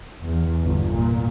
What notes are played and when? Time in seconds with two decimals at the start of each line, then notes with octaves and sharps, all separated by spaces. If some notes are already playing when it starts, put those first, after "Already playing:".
0.23 E2
0.63 G1
0.95 A#2